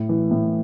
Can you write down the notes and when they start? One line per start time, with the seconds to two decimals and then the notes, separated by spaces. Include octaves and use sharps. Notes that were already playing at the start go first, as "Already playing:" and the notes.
Already playing: A2
0.09 E3
0.31 A2